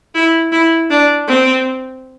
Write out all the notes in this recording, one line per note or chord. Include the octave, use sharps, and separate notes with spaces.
E4
E4
D4
C4